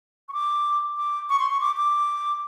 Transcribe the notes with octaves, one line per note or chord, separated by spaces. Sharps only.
C#6
D6
D6
C#6
C6
C#6
D6
D6